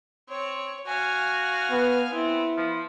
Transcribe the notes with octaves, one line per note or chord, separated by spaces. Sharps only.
C4 C#5
F#4 F5 G#5
B3
B3 C4 E4
F3